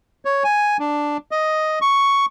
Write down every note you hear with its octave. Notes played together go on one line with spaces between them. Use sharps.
C#5
G#5
D4
D#5
C#6